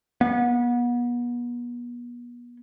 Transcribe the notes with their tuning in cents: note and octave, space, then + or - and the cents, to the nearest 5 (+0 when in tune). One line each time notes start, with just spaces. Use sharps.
B3 -35